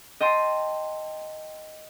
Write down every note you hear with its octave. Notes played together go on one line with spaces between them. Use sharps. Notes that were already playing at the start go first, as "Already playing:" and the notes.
D#5 G5 A5 C6